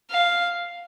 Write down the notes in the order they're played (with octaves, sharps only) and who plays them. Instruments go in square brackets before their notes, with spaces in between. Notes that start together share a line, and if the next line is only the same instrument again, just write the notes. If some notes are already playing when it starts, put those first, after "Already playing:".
[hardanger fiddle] F5